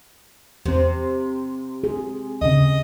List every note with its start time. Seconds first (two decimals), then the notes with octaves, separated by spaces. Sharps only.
0.66 E2 C3 C4
1.84 G#4
2.42 D#2 C#3 D#5